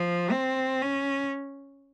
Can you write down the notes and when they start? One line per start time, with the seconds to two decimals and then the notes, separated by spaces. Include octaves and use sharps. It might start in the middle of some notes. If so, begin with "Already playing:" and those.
Already playing: F3
0.31 C4
0.82 C#4